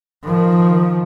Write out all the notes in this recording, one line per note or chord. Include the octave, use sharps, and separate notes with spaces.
D#3 F3